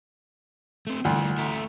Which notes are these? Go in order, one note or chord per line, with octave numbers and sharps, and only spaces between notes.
A3 C4
D2 G3 E4 F4
A3 E5 A#5